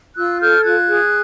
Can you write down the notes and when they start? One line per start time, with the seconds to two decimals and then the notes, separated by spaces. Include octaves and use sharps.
0.17 F4 E6 F#6
0.40 A4 F6 G6
0.63 F4 F#6 G#6
0.87 G#4